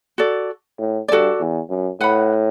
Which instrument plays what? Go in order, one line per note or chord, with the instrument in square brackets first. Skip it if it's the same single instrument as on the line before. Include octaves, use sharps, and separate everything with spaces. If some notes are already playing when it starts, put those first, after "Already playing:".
[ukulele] F#4 A4 D5
[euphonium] A2
[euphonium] G2 [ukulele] F#4 A4 D5
[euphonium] E2
F#2
[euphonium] A2 [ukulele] B4 F#5 B5